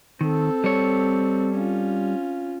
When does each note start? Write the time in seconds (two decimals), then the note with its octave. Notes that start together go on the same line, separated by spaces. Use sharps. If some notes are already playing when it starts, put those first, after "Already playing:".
0.21 D#3 C4 A4
0.64 G3 C#5
1.54 C#4 F4